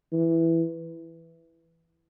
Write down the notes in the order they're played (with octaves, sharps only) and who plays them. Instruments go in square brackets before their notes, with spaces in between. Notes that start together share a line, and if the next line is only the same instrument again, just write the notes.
[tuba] E3